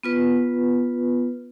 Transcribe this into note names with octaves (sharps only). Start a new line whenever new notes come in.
B3 F4 B4